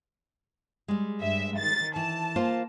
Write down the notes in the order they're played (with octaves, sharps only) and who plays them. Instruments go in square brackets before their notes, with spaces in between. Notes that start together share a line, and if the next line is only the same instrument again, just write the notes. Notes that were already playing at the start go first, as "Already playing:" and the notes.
[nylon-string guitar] G3 G#3
[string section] G2 E5
D#3 A6
[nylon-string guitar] E3 [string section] A5
[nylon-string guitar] A#3 F4 C5